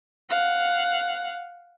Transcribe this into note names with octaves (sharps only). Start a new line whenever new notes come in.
F5 F#5